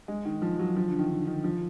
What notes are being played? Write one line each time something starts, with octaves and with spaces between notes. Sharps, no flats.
G#3
D#3
F3
F#3
F3
D3
D#3
D3
D#3
F3